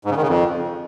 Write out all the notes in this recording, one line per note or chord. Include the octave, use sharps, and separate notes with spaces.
G#2
C#3
D#3
C#3
F2